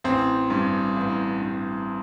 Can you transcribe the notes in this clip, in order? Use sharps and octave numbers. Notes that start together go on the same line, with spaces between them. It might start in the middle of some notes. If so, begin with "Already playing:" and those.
A1 C4
G2
A1
G2